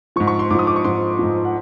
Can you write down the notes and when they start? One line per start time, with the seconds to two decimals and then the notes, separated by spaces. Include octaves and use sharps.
0.16 F3 C#6
0.20 G#2
0.27 C#6
0.39 C6
0.50 G#2 D6
0.55 F3 D#6
0.67 D6
0.76 C#6
0.84 G#2 F3 C6
1.19 G#2 F3
1.45 F#5